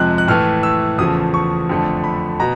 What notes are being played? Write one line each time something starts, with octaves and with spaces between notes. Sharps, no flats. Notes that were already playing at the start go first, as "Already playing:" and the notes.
Already playing: F2 C3 F3 G#3 F#6
F#6
A2 E3 A3 F6
E6
E2 C#3 F3 A3 D#6
C#6
F2 D3 F3 A3
B5
B2 A#5